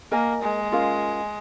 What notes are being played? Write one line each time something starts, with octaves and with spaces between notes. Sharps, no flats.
A#3 A#4 D#5 G#5
G#3
C#4 F4 A#4 F5